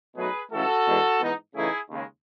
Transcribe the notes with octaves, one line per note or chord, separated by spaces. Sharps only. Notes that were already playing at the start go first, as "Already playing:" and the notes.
B2 F#3 A3 D#4 G#4 B4
C#2 C#3 E3 A3 F#4 A4
E2 B2 G#3 B3
G#2 E3 B3 D#4
C#3 E3 A3 D#4 E4 G#4
D#2 C#3 G#3